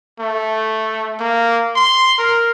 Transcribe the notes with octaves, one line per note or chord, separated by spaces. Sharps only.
A3
A#3
C6
A#4